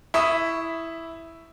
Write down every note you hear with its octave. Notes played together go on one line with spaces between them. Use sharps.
E4 C#6 D#6 B6 E7